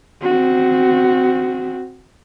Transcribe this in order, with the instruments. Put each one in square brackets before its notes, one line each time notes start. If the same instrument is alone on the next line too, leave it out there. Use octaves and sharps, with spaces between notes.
[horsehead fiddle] C4 F#4